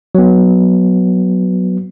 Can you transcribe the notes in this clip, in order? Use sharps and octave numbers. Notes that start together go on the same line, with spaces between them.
F#3 B3